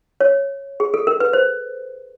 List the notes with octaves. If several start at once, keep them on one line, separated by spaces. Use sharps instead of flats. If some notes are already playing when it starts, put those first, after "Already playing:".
C#5
G#4
A4
A#4
B4
C5